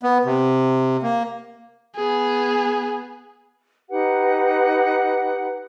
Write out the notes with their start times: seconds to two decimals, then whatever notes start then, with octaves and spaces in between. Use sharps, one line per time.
0.03 B3
0.25 C3
1.03 A#3
1.96 B3 G#4
3.89 D#4 G4 B4 F#5